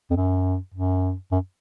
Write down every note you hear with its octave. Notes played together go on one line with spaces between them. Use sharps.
F2
F#2
F#2
F#2